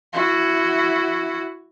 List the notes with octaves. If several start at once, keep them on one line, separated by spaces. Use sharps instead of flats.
E4 F#4